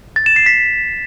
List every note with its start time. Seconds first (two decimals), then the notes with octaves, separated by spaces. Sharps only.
0.16 A6
0.26 E7
0.36 C7
0.46 B6